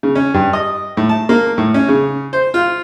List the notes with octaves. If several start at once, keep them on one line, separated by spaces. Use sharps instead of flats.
C#3
C#4
G2
D#5
A2
A5
A#3
A2
C#4
C#3
C5
F4